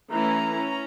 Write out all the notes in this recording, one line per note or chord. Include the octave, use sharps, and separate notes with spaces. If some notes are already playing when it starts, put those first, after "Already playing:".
E3 A3 C#4 E4 A#5
C#4